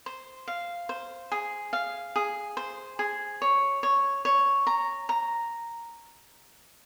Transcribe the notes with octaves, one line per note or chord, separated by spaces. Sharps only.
C5
F5
C5
G#4
F5
G#4
C5
G#4
C#5
C#5
C#5
A#5
A#5